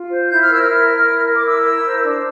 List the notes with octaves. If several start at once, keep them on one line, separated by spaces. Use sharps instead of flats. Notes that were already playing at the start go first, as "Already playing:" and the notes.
Already playing: F4
C5
E4 G6
F6
A#4 E6
F6
E4
A#4
E4
A#4
D6
E4 E6
A#4
C5
D4